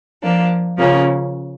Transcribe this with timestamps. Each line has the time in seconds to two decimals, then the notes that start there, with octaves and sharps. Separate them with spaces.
0.23 F3 A#3 D4
0.78 C#3 F3 A#3 C#4